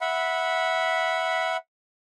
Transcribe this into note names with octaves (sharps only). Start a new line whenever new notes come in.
E5 F#5 B5